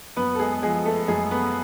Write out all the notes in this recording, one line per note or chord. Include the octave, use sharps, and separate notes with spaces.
F#2 B3 B4
A4
G#3 G#4
F3 G#3 G#4
A3 A4
F#2 G#3 G#4
B3 B4